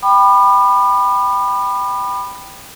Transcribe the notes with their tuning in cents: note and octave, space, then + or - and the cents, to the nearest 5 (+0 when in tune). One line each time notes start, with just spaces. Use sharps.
G5 +0 B5 +0 D6 +45